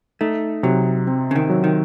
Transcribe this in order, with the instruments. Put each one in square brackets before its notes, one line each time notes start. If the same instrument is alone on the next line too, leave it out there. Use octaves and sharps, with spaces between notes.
[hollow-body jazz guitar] A3 [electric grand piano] D#4
[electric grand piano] C3 [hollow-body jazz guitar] F#3
[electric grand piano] C4
[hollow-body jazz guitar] C#3
D#3
[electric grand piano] F#3
[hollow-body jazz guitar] D#3